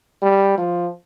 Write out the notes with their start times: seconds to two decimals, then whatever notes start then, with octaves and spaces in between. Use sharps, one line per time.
0.22 G3
0.58 F3